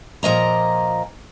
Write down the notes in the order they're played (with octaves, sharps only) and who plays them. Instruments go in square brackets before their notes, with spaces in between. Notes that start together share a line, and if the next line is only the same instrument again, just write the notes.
[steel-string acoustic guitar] A#2 F3 D#5 A#5